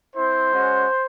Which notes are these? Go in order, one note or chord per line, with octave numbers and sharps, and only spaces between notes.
C4 E4 C5
G#3 C#4 F#4